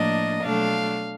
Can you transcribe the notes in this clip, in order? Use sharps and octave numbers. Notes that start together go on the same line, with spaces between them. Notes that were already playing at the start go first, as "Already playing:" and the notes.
Already playing: A2 F3 A#3 D4 D#5
B2 F#3 A3 D4 F5